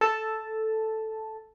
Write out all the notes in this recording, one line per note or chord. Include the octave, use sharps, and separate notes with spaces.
A4 A5